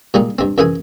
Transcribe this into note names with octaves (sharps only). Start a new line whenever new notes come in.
A#2 G3 G#3 D#4
G2 C4
F#2 E3 E4 G#4 G#5